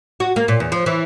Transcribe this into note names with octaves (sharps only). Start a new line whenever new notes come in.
F#4
A#3
A#2
E2
F3
E3